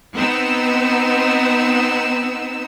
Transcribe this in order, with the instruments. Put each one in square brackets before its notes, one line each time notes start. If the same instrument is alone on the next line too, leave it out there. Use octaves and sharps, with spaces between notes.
[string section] B3 C4 D#4 E6